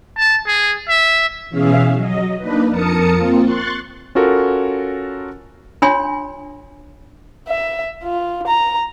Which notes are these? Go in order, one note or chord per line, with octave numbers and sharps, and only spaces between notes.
A5
G#4
E5
B2 E3 C#4 G#4 E5 F5
F#3 D#5
A#3 D4 D#4 B4
F2 A#4 A5 D#6 C#7
A#3 C4 F4
C6 C#6 F#6 A6
C#4 F4 F#4 A4 A#4
D4 F4 C#5 G#5 C6
E5
F4
A#5